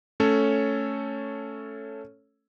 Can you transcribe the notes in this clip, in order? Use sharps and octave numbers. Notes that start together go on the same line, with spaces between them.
A3 C#4 A4 C#5